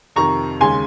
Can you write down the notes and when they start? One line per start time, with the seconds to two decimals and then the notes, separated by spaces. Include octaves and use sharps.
0.16 F2 C3 D#3 A#5 C#6
0.61 D#2 C#3 G#3 G#5 C6